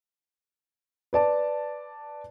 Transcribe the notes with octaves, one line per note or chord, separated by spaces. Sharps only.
B4 D5 A5